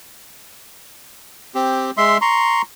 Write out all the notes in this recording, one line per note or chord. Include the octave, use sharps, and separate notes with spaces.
C4 G4
G#3 E5 C6
A#5 C6 C#6